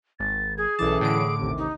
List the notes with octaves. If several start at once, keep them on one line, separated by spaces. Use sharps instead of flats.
G#1 A6
G#4 G#6
B1 E3 C#4 A4 A5 D6
A2 D3 D7
A1 D#2 C3
D#4